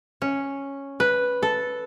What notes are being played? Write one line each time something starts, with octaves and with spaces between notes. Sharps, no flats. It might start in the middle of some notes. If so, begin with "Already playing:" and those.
C#4
B4
A4